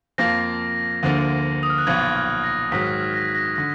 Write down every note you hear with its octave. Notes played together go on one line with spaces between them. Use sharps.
F2 F3 A#3 F4 A#6
D2 D3 F3 A#3
D#6
F6
F#6
B1 A#2 F3 B3 G#6
F#6
A#6
G#2 D#3 F#3 B6
A#6
A#6
D3 A#6